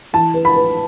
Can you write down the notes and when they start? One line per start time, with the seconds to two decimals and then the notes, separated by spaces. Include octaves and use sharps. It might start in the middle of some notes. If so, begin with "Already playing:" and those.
0.13 E3 A5
0.34 B4
0.45 B5
0.55 B4